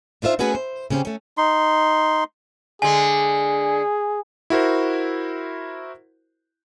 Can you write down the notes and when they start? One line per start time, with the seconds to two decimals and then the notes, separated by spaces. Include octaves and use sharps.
0.22 D4 D#4 F4 C5 E5
0.39 A3 B3 C#4 F#4 G#4 B4
0.55 C5
0.90 C#3 C4 C#4 G4 C5
1.05 A3 C#4
1.38 D#4 C6
2.82 D3 G#3 G#4 G#5
4.50 E4 F#4 A#4 C5